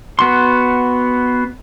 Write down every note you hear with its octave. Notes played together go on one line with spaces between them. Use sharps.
B3 F#4 C6